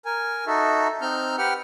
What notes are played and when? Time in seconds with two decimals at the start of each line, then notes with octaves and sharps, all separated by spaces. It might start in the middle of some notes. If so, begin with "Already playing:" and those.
0.05 A#4 G#5
0.47 D#4 F#4 A4 E5
1.01 C4 D#4 F6 G6
1.38 G4 B4 F#5 G5 F6